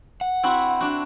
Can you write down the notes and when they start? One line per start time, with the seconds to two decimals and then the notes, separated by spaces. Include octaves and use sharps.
0.21 F#5
0.43 C4 E4 F#4
0.81 D4 F#4